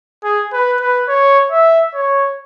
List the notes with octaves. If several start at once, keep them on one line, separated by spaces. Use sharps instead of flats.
G#4
B4
B4
C#5
E5
C#5